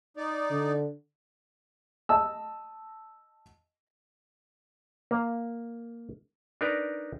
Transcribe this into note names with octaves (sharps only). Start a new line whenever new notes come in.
D#4 D5
D3
D#5 A5 E6
A#3
D4 D#4 A#4 B4 D5